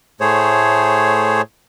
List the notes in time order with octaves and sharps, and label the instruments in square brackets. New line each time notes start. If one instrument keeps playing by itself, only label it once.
[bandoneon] A2 A3 G#4 C5 C#5